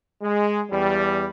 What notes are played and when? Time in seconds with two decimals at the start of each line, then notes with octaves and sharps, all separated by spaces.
0.22 G#3
0.71 E2 G3